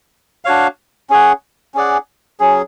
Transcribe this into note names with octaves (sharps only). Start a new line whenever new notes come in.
D4 F#4 C#5 F5
C#4 G#4 C#5 F#5
C#4 G#4 D5 F#5
F#3 C#4 G#4